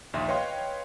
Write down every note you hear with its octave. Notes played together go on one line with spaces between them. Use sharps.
A#1 D#2 E5 C6
B4 C#5 D#5 F5 G5 C6